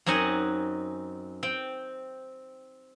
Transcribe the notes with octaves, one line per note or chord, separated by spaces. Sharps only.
F#2 C4 D#4 F#5 G#5
C4 G5